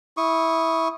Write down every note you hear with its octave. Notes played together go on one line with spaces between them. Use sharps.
E4 C#6 D#6